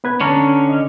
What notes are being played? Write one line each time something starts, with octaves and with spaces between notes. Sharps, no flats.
B3 B4 G#6
D3 C#4 C#5 A5 A#5
D#5